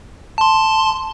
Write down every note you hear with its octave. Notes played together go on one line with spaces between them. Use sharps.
A5 C6